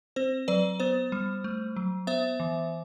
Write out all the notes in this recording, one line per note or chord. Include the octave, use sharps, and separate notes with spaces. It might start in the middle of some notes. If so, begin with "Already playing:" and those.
C4 C5
F#3 B4 D5
B3 C5
G3
A3
F#3
B3 C5 E5
E3